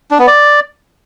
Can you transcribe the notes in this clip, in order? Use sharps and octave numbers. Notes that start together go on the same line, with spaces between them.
D4
B3
D5